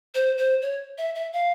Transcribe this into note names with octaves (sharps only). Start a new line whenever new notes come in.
C5
C5
C#5
E5
E5
F5